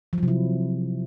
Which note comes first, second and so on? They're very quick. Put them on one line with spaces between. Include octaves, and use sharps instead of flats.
F3 F#3 C3 E4